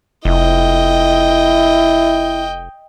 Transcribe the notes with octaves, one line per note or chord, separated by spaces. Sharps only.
F1 E4 D#5 G5